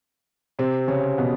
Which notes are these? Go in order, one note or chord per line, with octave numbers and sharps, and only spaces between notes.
C3 C4
C#3 C#4
B2 B3